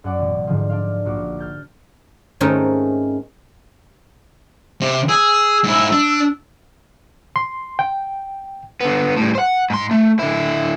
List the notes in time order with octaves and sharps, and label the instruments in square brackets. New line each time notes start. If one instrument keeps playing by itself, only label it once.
[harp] F#2 D5 F#5 D6
A1 B2 E3
G#2 D3 F3
D4 C5 D5 F5
A#1 F#4 D6
F6 G6 A6
[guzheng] G#2 D#3 A3 C4 C#4 D#4
[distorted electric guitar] C3
[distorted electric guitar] G#4 [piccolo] E6
[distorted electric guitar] G#2 E4
D4
[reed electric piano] C6
G5
[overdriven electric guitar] D3 B3
A2 G3
C5 F#5
G#2 C6
A3
D3 E4